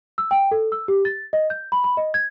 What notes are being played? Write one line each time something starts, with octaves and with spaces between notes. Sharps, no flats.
E6
G5
A4
E6
G4
A6
D#5
G6
B5
B5
D#5
G#6